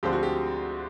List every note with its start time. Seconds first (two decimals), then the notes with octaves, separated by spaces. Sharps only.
0.03 D2 D3 F3 G#3 C4 G4
0.13 F#4
0.23 G4